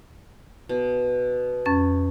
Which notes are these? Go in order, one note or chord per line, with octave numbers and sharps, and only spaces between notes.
B2
F2 C#4 A6